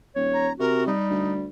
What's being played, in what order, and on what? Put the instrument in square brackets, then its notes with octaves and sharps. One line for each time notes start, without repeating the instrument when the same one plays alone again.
[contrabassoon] D#1 [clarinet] C#5
[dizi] A#5
[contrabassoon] C3 [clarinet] F#4 [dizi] A#4
[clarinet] G3 [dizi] D#4
[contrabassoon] D2